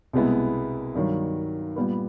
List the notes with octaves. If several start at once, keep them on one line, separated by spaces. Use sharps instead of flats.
C2 B2 G#3 B3 E4
G2 D#3 F#3
A#2 G3 B3